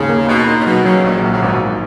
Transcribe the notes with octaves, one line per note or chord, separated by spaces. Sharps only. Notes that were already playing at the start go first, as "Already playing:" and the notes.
Already playing: D#2 G#2 C#3
A#3
B2 D#4
A#2 D#4
C#3
B2 F#3
C#3 F#3
A#1 D#2 D#3
A#1 C#3
C#3
G#1 B2
G#1